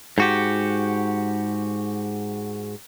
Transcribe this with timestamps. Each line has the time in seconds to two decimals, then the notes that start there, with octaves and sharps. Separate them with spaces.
0.18 G#2 F#4 G4